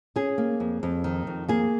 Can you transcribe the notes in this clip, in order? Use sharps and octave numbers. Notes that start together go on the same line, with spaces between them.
C#4 G#4
A#3
F2
F2
D#3
F2
A#3 G#4